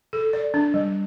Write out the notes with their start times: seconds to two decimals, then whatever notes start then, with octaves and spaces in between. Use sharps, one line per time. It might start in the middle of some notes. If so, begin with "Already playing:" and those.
0.13 A4
0.33 D5
0.54 D4
0.74 G3